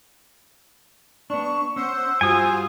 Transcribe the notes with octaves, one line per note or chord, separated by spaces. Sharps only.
B3 D4 C#6
C#4 C5 F#5 E6
G2 F4 F#4 C5 G#5 D#6